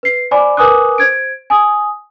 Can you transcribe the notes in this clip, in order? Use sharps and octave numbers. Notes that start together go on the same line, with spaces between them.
B4 C7
C5 D5 G#5 B5 D6
A#4 B4 G#5 D6 D#6 F#6
C5 G#6 D7
G#5 D#6